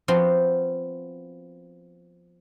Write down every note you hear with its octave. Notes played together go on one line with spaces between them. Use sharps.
F3 B3 C4 F#4 G5 C6